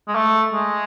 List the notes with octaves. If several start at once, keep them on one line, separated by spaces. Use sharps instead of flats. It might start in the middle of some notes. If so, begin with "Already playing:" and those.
G#3
A3
G#3